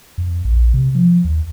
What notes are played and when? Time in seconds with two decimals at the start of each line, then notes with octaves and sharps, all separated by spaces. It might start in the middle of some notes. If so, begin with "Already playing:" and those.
0.18 F2
0.45 A#1
0.74 C3
0.95 F3
1.25 D#2